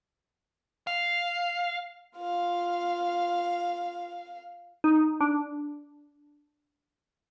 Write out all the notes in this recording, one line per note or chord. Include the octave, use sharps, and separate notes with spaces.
F5
F4 F5
D#4
D4